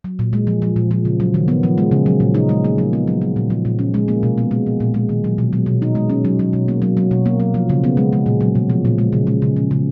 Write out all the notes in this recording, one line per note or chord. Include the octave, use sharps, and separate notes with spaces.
F#3
A#2
G#3
F3
F3
A#2
F3
C#3
F#3
D#3
B3
F3
G#3
C#3
F#3
A#2
D#4
G#3
A#3
F3
B3
F#3
F#3
A#2
F3
A#2
C#4
G#3
A#3
B2
B3
G#3
F3
A#2
G#3
D#3
F#3
B2
F#3
B2
D#4
G#3
C#4
F#3
F#3
B2
A#3
F#3
F#3
B2
A#3
F#3
F3
C#3
B3
G#3
G#3
A#2
F#3
B2
F3
A#2
G#3
C#3
G#3
C#3
F3
C#3